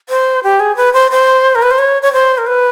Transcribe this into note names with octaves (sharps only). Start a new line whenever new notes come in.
C5
G4
G#4
B4
C5
C5
A#4
B4
C5
C#5
C#5
C5
A#4
B4